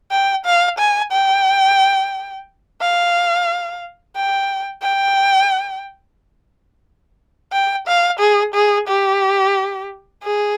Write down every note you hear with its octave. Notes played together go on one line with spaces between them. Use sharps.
G5
F5
G#5
G5
F5
G5
G5
G5
F5
G#4
G#4
G4
G#4